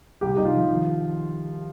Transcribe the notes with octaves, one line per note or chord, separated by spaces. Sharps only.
C2 G4
C2 D#4
F4
F3
D#3